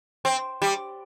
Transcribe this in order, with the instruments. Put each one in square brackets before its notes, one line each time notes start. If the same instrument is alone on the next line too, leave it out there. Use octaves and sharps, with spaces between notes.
[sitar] C4
G3